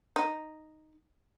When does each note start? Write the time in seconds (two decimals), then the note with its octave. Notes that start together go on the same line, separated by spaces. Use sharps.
0.16 D#4